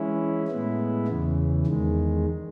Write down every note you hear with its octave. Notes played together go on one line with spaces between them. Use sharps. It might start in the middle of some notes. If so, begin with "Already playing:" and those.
Already playing: E3 G#3 C#4 E4
A2 G#3 B3 E4
E2 C#3 E3
E2 D#3 G#3